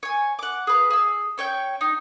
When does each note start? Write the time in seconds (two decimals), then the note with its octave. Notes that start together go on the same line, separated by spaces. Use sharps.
0.03 C#5 G#5
0.39 F#5 D6
0.67 G#4 B4 F5
0.90 G#4 E6
1.38 C#4 C#5 G5 G6
1.81 D#4